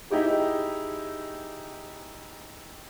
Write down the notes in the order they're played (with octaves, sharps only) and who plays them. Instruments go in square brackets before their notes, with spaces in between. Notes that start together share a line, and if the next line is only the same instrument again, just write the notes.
[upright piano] D#4 E4 G4 G#4